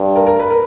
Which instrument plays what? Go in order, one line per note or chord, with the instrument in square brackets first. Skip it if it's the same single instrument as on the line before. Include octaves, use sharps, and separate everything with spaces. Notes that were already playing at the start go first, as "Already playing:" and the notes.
Already playing: [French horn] G2
[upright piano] A#4
A#4
B4
A#4